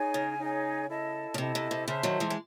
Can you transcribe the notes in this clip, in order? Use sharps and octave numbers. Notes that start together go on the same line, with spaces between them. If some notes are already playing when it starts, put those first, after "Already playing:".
Already playing: D#4 G#4 C#5 G#5
C#3
D#4 G#4 C#5 G#5
E4 A4 D#5 A5
C#3
C3 E4 A4 D#5 A5
C3
C3
C#3 C5 E5 A5 C6
D#3 F#3
E3 G#3
G#3